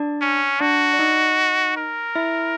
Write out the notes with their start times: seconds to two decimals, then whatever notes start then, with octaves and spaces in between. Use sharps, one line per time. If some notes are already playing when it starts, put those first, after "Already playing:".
Already playing: D4 D5
0.22 C#4
0.60 D4 F#4 D5
0.93 D5
0.99 D#4 D#5
1.77 A#4
2.15 E4 E5